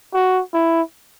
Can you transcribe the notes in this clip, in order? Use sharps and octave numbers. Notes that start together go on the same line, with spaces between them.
F#4
E4